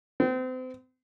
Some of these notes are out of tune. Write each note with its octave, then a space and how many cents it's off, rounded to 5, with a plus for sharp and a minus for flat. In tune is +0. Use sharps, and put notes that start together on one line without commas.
C4 -35